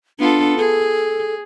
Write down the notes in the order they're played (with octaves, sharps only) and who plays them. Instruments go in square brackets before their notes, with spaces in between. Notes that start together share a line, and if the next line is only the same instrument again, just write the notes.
[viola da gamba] B3 F4 A4 [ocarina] D4
[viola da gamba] G#4 [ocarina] A4